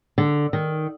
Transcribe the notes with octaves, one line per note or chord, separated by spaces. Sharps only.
D3
D#3